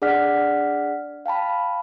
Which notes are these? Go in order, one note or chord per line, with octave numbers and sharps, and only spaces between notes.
D4 G#4 D5 F#5 F6 B6
F5 G5 A5 B5